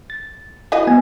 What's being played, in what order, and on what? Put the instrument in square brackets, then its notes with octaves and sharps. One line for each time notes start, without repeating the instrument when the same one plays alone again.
[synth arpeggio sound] A6
[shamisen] E4 F#4 D#5
[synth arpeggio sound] B3 G#5